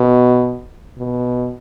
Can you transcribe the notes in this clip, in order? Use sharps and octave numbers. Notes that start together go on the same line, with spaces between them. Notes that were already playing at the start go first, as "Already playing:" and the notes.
Already playing: B2
B2